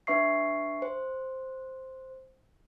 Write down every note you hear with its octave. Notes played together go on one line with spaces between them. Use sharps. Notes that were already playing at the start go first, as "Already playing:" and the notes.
D4 B4 E5 C#6 C7
C5